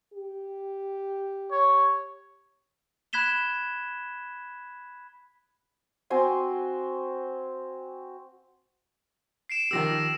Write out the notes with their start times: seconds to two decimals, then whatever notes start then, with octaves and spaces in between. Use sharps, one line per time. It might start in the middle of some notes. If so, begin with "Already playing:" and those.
0.13 G4
1.52 C#5
3.13 B5 F#6 G#6 B6 E7 G7
6.10 C4 F#4 G#5 C6
9.50 C7 D7 E7
9.71 D#3 F3 G4 E6 A#6